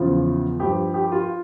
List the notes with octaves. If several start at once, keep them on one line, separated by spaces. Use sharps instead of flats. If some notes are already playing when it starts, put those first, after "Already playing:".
Already playing: E2 C#3 F3 F4
G2 F3 G4
G4
F4